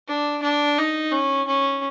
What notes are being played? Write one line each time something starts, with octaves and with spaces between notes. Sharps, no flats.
D4
D4
D#4
C#4
C#4